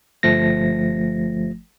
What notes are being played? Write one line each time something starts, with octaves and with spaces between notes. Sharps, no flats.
G1 F3 A3 A#6